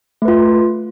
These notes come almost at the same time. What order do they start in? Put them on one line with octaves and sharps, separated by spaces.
A3 B4 F4